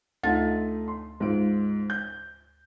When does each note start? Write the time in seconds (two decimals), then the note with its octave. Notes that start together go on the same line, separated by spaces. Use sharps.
0.23 D2 A3 D#4 F4 A6
0.88 C6
1.20 G#2 F4 D7
1.90 G6